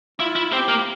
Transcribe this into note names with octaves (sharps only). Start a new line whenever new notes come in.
E4 F4
E4
C4 G4
A#3